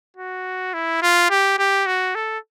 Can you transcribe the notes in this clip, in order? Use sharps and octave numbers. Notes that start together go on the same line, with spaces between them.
F#4
E4
F4
G4
G4
F#4
A4